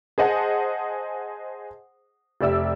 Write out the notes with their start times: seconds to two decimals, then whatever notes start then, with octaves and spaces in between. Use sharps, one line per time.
0.18 G#4 C5 D#5 F#5 G#5 A5
2.41 F1 G4 D5 E5 E6